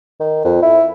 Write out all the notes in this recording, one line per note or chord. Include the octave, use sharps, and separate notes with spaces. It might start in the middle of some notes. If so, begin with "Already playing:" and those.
D#3
F2
E4